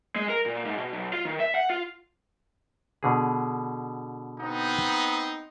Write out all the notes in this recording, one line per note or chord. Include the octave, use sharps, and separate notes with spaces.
G#3
A#4
A#2
G#2
B2
B1
F4
D#3
E5
F#5
F4
B2 D3 G#4
B3 C4 D#4